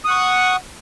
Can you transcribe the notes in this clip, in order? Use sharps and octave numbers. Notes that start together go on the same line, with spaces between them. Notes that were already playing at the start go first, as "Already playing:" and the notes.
F#5 C#6 D#6